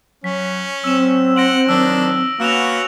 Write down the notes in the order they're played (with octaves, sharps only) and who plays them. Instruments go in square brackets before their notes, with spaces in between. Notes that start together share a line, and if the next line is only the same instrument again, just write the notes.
[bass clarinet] F#3 [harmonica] C#4 [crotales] B6
[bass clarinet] F#3 [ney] C4 [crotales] E6 E7
[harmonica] F#5 C6 [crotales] A#6 D7 F#7
[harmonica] D#3 D4 [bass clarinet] F#3 [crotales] E6
[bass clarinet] A#3 [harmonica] B3 C#4 F#4 [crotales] E6 E7 F7